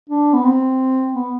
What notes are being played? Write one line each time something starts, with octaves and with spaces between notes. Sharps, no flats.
D4
B3
C4
B3